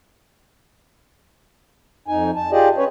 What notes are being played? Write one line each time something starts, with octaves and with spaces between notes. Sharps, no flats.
F2 D#4 G#5
A5
F4 G4 G#4 D5 D#5
C#4 B4 C#5